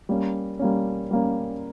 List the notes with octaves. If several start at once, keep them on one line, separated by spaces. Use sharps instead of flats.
G3 A#3 C#4
G3 A#3 C#4
G3 A#3 C#4